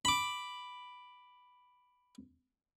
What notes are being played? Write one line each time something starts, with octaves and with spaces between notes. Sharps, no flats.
B5 D6